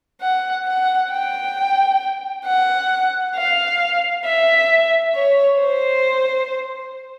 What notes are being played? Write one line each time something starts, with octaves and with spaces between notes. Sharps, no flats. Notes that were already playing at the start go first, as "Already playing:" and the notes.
F#5
F#5
G5
F#5
F5
E5
C#5
C5